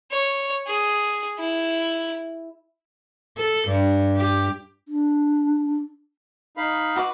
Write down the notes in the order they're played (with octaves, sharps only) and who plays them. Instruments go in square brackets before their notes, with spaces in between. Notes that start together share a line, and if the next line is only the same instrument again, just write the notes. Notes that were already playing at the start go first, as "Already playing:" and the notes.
[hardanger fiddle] C#5
G#4
E4
[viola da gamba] A4
G2
G4
[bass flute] D4
[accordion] D#4 F5 B5
[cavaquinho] F#4 B4 D6